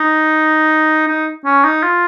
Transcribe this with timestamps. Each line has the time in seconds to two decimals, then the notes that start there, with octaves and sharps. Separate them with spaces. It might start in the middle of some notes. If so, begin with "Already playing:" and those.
Already playing: D#4
1.07 D#4
1.45 C#4
1.64 D#4
1.83 F4